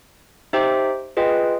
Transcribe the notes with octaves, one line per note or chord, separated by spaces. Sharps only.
D#4 G4 C5 E5 G5
F4 G#4 B4 D#5 G5